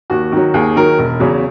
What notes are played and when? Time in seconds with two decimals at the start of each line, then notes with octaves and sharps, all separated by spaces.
0.10 D#2 F#4
0.32 D#3 F#3
0.54 D#2 G#4
0.76 D#3 F#3 A#4
0.99 E1
1.20 E2 C#3 F#3